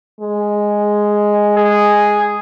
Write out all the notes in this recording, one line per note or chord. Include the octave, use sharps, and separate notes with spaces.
G#3
G#4